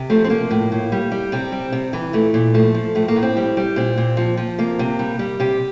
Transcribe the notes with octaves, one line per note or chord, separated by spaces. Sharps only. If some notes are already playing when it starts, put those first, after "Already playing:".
Already playing: C3
F3 A3
C4
F3 A#3
A2
A2
G3
G3
C3 C4
G3
C3
E3
A#2 A3
A#2
F3 A3
F3
A2 A3
A#3
A2
C4
G3
G3
A#2 C4
A#2
F3
F3
C3 A#3
C3
G3
G3
C3 G4